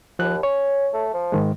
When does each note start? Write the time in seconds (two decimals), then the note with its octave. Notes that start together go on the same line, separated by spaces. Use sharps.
0.19 D#2 F3 F#6
0.43 C#4 C#5
0.94 A3
1.14 F3
1.32 G#2 D#3 G#3